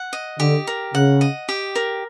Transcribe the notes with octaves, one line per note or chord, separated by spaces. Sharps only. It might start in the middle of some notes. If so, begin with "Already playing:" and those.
Already playing: F#5
D#5
D3 G4
A#4
C#3 F#5
D#5
G4
A#4